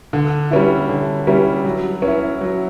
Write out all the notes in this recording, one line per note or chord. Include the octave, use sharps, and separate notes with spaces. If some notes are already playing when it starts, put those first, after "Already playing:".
D3
G3 C#4 E4
D3
G3 C#4 E4
F#3
C#4
E4
F#3